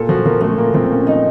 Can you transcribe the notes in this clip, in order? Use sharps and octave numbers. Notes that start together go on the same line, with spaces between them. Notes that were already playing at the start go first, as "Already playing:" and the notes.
Already playing: A#2 A4
F3 F#4
F3 A#3
F3 A3
A#2 A#3
F3 C4
A#2 C#4
F3 D#4